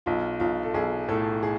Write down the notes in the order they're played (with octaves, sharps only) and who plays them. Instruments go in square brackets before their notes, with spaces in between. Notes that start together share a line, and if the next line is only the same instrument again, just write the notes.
[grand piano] B1 [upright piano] F4
[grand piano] B1 [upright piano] F4
[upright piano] A4
[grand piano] B1 [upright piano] G#4
[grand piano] A2 [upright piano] A4
[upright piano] G#4